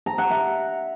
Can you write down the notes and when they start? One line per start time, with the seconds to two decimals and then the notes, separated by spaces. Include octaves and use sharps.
0.06 A#5
0.18 F#5
0.30 E5